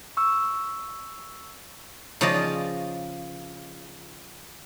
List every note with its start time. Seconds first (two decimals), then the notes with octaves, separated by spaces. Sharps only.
0.17 C#6 E6
2.21 C#3 F3 C#4 F4 D5 D#5